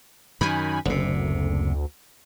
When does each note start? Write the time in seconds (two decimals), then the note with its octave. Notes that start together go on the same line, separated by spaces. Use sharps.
0.41 F#2 D#3 G#5 B5
0.85 F#1 D2 C3